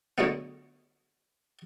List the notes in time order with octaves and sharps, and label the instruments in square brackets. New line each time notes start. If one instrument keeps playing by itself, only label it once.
[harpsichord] D3 F#3 G#3 A3 B3